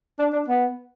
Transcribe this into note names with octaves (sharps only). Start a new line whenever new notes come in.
D4
D4
B3